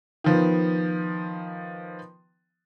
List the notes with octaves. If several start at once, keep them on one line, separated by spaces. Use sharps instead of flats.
D#3 F3 B3